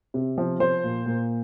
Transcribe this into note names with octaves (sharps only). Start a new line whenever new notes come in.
C3
F3
F3 C5
A#2
A#2